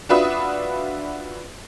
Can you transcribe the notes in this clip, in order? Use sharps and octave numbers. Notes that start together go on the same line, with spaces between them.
D4 F4 F#4 B4 E5 D#6